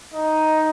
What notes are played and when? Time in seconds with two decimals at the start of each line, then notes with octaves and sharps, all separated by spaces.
0.14 D#4